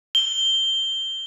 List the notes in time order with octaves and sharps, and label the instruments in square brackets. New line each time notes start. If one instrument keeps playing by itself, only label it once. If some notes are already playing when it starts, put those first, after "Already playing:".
[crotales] G7